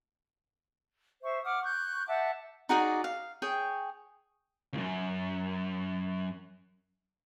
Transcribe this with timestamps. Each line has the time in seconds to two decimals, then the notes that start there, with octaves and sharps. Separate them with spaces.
1.22 C5 E5 C#6
1.44 F#5 D6 D#6 F6
1.63 C#6 F#6 G6
2.07 E5 F#5 A5 D6
2.69 D#4 F#4 G#4 D5
3.04 F5
3.42 G#4 C#5 G5
4.73 C#2 F#2